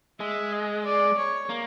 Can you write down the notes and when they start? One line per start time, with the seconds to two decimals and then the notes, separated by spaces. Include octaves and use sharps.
0.20 G#3 E5
0.53 D#5
0.85 D5
1.18 C#5
1.49 A#3